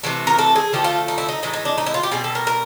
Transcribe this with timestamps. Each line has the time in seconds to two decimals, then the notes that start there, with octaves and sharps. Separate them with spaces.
0.03 C3 E3 A3
0.27 A#4
0.39 A4
0.56 G#4
0.72 D3 F3 A3 G4
0.84 F4
1.08 D#4
1.18 E4
1.29 D#4
1.43 A2 E3 G#3 D#4
1.53 D#4
1.65 D4
1.78 D#4
1.86 E4
1.94 F4
2.03 G4
2.11 B2 G3 G#4
2.24 A4
2.35 A#4
2.47 A#4